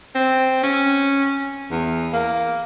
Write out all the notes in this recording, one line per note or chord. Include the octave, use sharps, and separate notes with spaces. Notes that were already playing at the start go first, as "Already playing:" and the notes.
C4
C#4
E2
A#3